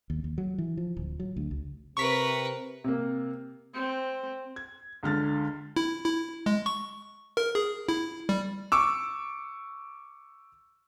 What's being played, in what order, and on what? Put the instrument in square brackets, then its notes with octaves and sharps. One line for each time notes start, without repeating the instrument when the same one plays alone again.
[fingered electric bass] D#2
D#2
F#3
E3
F3
D1
F#3
D2
C#2
[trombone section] C3 [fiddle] A#4 B4 [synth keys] C#6 B6
[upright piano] C3 A#3
[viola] C4
[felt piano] G#6
C#2 D3 F6 A6
[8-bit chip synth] E4
E4
G#3
C#6
A#4
G#4
E4
G3
[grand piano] C#6 D6 E6